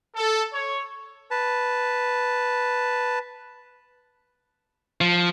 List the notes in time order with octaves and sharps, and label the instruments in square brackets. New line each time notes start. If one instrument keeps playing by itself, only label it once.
[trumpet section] A4
C#5
[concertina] B4 A5
[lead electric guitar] F3